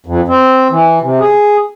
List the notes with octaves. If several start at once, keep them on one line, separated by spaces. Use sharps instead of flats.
F2
C4
E3
C3
G#4